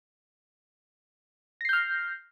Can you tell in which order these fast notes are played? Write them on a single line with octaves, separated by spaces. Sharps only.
A#6 C7 G6 F6